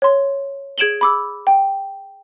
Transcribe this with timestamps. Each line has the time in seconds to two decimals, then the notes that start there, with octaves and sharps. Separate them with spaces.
0.02 C#5 C6
0.78 G#4 G#6 D7 E7 F#7 G7
1.01 B5 D6 E6
1.47 G5